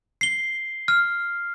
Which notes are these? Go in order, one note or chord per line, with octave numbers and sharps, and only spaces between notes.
C7 G7
F6